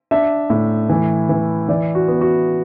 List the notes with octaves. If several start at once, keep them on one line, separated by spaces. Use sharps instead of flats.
D4 E5
A2
E3
E3
E3 D5
F#4
B3
F#4